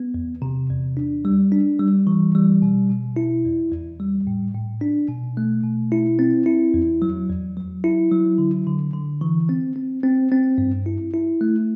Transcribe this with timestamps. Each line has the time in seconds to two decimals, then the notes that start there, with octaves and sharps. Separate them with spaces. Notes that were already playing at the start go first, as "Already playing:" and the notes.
Already playing: B3
0.14 E2
0.42 C3
0.70 E2
0.97 D4
1.25 G3
1.52 D4
1.79 G3
2.07 E3
2.35 G3
2.62 B2
2.90 B2
3.16 E4
3.45 E2
3.72 E2
4.00 G3
4.27 A2
4.54 A2
4.81 D4
5.09 B2
5.37 A3
5.64 B2
5.92 E4
6.19 C4
6.46 E4
6.74 E2
7.02 F#3
7.30 E2
7.57 F#3
7.84 E4
8.12 F#3
8.38 D3
8.67 D3
8.94 D3
9.21 E3
9.49 C4
9.76 C4
10.03 C4
10.32 C4
10.58 G2
10.86 E4
11.14 E4
11.41 A3